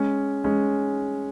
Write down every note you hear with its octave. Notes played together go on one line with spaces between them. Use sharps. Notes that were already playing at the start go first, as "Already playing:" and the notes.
Already playing: G#3 C#4
G#3 C#4